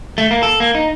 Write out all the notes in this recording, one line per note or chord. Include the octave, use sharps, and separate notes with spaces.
A3
A#3
A4
A#3
D#4